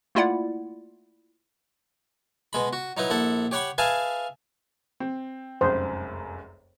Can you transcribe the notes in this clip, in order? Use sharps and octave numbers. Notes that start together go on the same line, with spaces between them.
A3 A#3 E4 F4 D5 F#5
B2 G#3 B5
F#4
F#3 D#4 E4 B4
A#1 E4 A4 F#5
G4 C#5 F#5 B5 C#6
G#4 B4 E5 F5 G#5 A5
C4
F1 C#2 F#2 C5